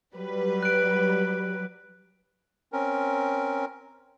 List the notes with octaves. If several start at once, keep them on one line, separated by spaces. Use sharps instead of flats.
F#3 G3 B4
F#6 D7
C4 C#4 A#4